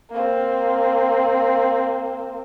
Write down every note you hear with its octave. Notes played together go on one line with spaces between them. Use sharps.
A#3 C4